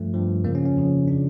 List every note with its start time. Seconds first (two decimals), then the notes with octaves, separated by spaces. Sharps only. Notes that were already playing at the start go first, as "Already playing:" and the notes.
Already playing: G2 F3 A3
0.14 G2 F3
0.44 F2 C#3 F3 A#3
0.55 C#4
0.65 C#4
0.77 F2 C#3 F3
1.08 C#3 F3 D4